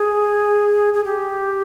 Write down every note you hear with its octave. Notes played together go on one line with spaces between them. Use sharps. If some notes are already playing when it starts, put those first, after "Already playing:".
Already playing: G#4
G#4
G4